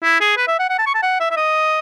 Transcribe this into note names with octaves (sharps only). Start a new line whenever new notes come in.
E4
G#4
B4
E5
F#5
F#5
A5
C#6
A5
F#5
E5
E5
D#5